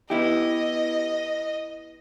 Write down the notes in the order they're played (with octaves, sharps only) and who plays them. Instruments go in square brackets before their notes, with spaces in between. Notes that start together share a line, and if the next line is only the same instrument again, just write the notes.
[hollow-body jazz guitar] B3 E4 G4 [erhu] D#5